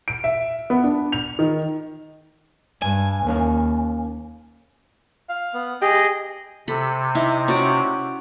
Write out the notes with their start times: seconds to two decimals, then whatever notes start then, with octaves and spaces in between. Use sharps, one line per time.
0.08 D7
0.24 E5
0.70 B3
0.84 D4
1.12 F7
1.39 D#3
2.82 G2 G#5
3.27 D#2 A#3 C#4 F5
5.29 F5
5.54 B3
5.82 G4 G#4 D#5
6.68 C3 A4 B5
7.15 D#4 E4
7.48 C#4 F#4 D5